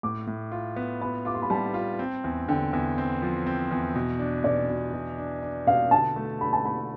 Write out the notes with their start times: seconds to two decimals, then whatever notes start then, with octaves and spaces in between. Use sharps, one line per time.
0.03 A2 D6
0.27 A2
0.52 F4
0.76 B3
1.01 B3 B5
1.25 F4 D6
1.35 C6
1.42 B5
1.50 G3 A5
1.74 F4
1.99 C4
2.24 E2
2.49 D3 G5
2.73 E2
2.98 C4
3.22 F3
3.47 C4
3.71 E2
3.96 B2
4.19 D4
4.44 B2 D5
4.70 B2
4.93 B2
5.18 D4
5.42 D4
5.67 B2 F5
5.91 D3 A5
6.16 A3
6.41 D3 B5
6.53 A5
6.65 A3 B5